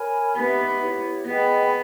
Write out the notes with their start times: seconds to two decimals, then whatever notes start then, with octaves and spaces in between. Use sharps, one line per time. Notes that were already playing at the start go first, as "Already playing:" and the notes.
Already playing: A#4 C#5 G#5 B5
0.36 B3 D#4 G4 B4 E5
0.81 E4 G4 C#5
1.27 B3 G#4 D#5 G5 B5